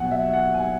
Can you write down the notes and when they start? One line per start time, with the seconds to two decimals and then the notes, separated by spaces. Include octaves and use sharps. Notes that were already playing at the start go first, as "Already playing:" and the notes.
Already playing: B2 F#3 F#5 G#5
0.11 E5
0.33 F#5
0.54 G#5